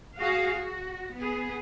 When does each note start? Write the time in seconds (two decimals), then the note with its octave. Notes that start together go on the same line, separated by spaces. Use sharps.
0.17 F#4 G#4 F5
0.56 F#4
1.16 B3 G#4